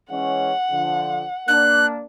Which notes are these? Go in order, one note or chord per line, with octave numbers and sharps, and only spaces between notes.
E3 G#3 C#4 F#5
D3 F3
A#3 D4 F#6